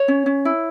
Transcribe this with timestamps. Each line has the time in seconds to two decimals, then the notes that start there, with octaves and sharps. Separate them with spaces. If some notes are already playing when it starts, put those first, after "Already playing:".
Already playing: C#5
0.08 C#4
0.26 C#4
0.45 E4